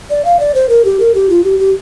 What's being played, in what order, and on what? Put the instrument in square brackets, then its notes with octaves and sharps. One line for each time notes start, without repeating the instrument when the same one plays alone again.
[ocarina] D5
F5
D5
C5
A#4
G4
A#4
G4
F4
G4
G4